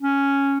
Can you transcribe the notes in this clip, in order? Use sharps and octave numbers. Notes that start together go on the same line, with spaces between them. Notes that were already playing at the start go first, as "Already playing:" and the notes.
C#4